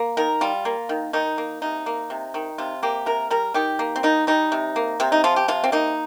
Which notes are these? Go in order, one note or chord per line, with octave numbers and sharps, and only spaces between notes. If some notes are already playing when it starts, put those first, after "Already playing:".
Already playing: A#3
D#3 A#4
G3 F4
A#3
D#3
D#3 D#4
A#3
C3 D#4
A#3
C3
D#3
C3 F4
A#3 G4
C3 A#4
G3 A#4
D#3 G4
A#3
C4
D#3 D#4
G3 D#4
C3
A#3
C3 C4
D#4
F3 F4
G4
C3 F4
C4
A#3 D#4